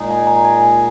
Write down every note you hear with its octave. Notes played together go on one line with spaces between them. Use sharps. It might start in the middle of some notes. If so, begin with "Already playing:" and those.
Already playing: A#2 G#3 D#4 G#4
G#5
A#5
G#5
G#5